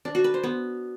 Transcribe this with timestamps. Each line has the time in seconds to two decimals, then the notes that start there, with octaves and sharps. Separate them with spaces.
0.05 D4
0.15 F#4
0.24 B4
0.34 C5
0.44 B3